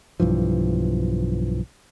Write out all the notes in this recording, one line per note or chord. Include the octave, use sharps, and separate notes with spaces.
B1 G2 E3 F3